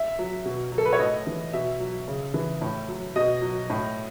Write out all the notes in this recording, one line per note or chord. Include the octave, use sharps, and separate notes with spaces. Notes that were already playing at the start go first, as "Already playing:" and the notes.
Already playing: E5
F#3
B2
F#3
A4
B4
C#5
A2 D#5
E3
B2 E5
F#3
C#3
E3
A2
F#3
B2 D#5
F#3
A2